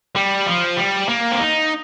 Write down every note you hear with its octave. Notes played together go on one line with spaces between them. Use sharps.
G3
F3
G3
A#3
C4
D#4